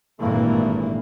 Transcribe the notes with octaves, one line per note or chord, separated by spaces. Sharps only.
G#1 G2 A#2 E3 A3 A#3